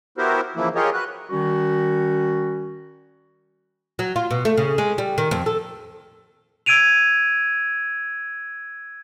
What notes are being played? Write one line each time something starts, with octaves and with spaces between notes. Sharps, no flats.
B3 E4 F#4 G4 A#4 C5
C#3 E3 F3 A#3 E4
F4 G4 G#4 A#4 C#5 D#5
F#4 B4 F#6
D#3 G3 C#4 F#4
F#3
F4
B2
A3
C#3
G#3
G3
D#3
F2
A4
E6 G#6 D7 D#7 F7